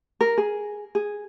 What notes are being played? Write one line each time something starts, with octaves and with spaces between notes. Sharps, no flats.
A#4
G#4
G#4